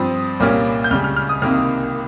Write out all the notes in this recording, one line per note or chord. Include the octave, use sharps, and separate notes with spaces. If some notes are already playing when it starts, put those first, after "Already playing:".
Already playing: G2 F3 C4 D#6
C2 A#2 G3 A#3 C#4
G6
C#2 C#3 G3 F6
F6
F6
D#6
C2 C3 D#3 A#3 F6